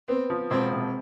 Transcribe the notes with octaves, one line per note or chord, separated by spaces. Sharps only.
B3 C4
F3
E1 C4
C3